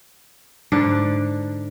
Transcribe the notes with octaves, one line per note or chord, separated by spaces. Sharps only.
G#2 D3 D4